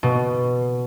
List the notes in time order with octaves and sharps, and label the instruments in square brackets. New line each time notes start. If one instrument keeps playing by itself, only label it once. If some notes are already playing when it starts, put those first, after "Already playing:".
[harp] B2